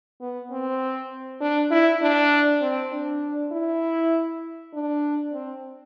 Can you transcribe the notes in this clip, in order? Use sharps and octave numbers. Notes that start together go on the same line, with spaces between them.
B3
C4
D4
E4
D4
C4
D4
E4
D4
C4